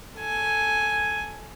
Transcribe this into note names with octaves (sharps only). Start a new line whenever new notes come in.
A4 G#5